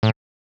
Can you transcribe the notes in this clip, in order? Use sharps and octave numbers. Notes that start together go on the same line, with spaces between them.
A2